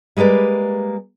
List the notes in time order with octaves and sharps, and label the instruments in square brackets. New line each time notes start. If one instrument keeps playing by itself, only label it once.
[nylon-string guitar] G3 G#3 A#3 B4 D5